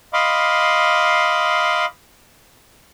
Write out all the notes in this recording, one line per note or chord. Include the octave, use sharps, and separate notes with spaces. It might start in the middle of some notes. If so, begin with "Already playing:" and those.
D#5 F5 B5 C6 D6